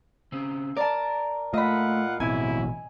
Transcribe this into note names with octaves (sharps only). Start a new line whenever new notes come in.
C#3 C4
A#4 D5 A5
A#2 A3 F4 D#5 F#5 B5
A1 B2 F#3 C4 E4 G#5